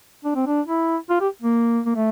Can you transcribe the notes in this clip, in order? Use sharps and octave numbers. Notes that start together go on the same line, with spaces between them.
D4
C4
D4
E4
F4
G4
A#3
A#3
A3